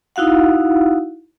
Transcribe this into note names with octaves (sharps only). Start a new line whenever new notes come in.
D#4 E4 F#4 F5 F#5